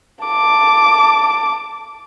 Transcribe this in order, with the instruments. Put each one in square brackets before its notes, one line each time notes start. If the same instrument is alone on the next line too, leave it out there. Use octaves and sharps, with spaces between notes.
[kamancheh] A5 D6